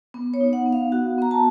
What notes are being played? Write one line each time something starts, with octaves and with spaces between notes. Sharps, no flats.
B3
C#5
D#4
F#5
B3
F5
F#4 F#5
B3 A#5
A5